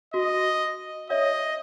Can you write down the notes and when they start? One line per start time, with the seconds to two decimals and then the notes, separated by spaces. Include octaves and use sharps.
0.14 F#4 D#5
1.10 C#5 D#5 E5